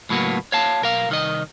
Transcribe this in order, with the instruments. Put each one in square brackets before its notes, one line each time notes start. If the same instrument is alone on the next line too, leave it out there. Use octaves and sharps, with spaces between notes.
[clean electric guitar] C#2 A2 F#3 A#3 B3
C#5 F5 A5
B1 A#4 F5
C2 D#3 D#5